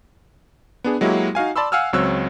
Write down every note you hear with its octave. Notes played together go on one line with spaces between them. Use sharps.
B3 D4 G#4
F#3 G#3 A#3 E4 F#4 G4
D#4 F#4 F5 G#5
D5 A5 B5 C6 E6
F5 F#5 G#5 E6 F6
C#2 F#3 C4 C#5 E6 F#6